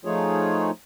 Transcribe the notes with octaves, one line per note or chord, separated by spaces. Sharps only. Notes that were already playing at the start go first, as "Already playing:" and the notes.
F3 A3 D#4 F4 G#4 C#5